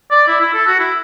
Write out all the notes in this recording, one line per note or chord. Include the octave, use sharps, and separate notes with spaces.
D5
E4
E4
A4
F#4
E4